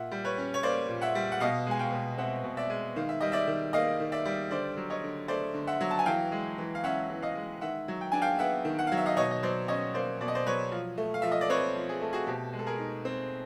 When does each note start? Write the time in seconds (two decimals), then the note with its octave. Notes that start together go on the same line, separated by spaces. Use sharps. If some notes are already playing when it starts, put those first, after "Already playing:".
Already playing: A#2 E5 F#5
0.11 G3
0.25 B4 C#5
0.38 C#4
0.54 C#5
0.63 A#3 C5 D5
0.89 A#2
1.01 E5 F#5
1.15 G3
1.32 F#5
1.40 B2 D#5 F5
1.66 G#3 G#5
1.79 F5 G5
1.92 B2
2.18 C4 E5 F#5
2.44 B2
2.57 D5 E5
2.70 G#3
2.96 D#3 F5
3.09 E5
3.21 G3 D#5
3.32 D5 E5
3.47 D#3
3.73 A#3 D#5 F5
4.00 D#3
4.12 D5 E5
4.25 G3
4.51 D3 C5 D5
4.77 F#3
4.90 C#5 D#5
5.04 D3
5.28 A3 C5 D5
5.54 D3
5.67 E5 F#5
5.81 F#3
5.91 A5
5.99 G#5
6.06 E3 F5 G5
6.32 G#3
6.58 E3
6.75 F5
6.84 C#4 E5 F#5
7.10 E3
7.22 D#5 F5
7.35 G#3
7.61 D#3 E5 F#5
7.88 F#3
8.01 G5
8.12 D4 G#5
8.22 F5 G5
8.39 B3 E5 F#5
8.65 D#3
8.79 F#5
8.87 F5
8.92 F#3
8.97 E5
9.06 D#5 F5
9.16 B2 C#5 D#5
9.31 D#5
9.43 F#3 C5 D5
9.68 C#4 C#5 D#5
9.94 A#3 C5 D5
10.21 B2 D5
10.28 D#5
10.35 C5 D5
10.46 F#3 B4 C#5
10.72 F3
10.98 A3
11.14 F5
11.22 F3 E5
11.32 D#5
11.41 D5
11.50 C4 B4 C#5
11.76 F3
11.89 G#4
12.01 A3 A4
12.13 F#4 G#4
12.27 B2 G4 A4
12.53 G#3
12.59 A4
12.66 G#4 A#4
12.79 D#4
13.05 C4